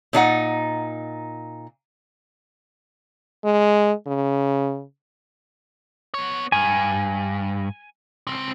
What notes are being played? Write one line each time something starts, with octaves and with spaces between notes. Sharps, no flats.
A#2 D4 D#4 F#5
G#3
C#3
B3 C#5
G2 G#5
C#2 C4